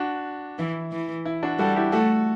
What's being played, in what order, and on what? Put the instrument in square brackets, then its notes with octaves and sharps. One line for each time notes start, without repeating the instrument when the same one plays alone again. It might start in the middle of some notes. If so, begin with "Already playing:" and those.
Already playing: [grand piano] D4 F#4
[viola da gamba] E3 [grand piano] E4
[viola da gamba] E3
[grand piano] E4
D4 F#4
[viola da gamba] G3 [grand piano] F#4 A4
[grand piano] E4 G4
[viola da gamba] A3 [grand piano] F#4 A4